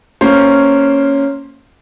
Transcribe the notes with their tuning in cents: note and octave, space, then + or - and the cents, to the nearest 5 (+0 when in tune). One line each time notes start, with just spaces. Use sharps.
A#3 -10 C#4 +0 C5 +10